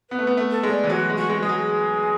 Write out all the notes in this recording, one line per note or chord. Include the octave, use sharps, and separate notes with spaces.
B3 B4
A3
B3
A3
A4
G#3
D5
E3
F#3 F#4
G#3
F#4
G#3
G#3 G#4
F#3